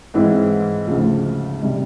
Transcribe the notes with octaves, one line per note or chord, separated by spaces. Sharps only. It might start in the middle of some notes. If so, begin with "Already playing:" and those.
G#2 E3 G#3 C4 E4
D2 C#3 F3
C3 D#3 G3